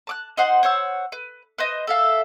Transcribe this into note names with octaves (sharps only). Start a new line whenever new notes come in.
A5 D6 F#6
D#4 C5 F#5 C6
C5 C#5 F#5 E6
B4
B4 C5 D#5
A4 E5 F5